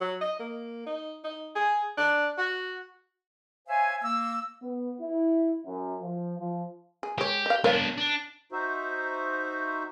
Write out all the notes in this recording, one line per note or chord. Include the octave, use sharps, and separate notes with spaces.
F#3
D#5
A#3
D#4
D#4
G#4
D4
F#4
C5 C#5 E5 F5 G#5
A#3 E6
B3
E4
F#2
F3
F3
G#4
G#3 G4 C#5
D#5 F5
B3 D4 A#4 C#5 F5
D4
D#4 F#4 C5 E5